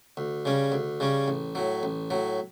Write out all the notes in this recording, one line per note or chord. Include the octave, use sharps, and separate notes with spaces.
D2
C#3 G3 C#4
D2
C#3 G3 C#4
A1
A2 F#3
A1
A2 F#3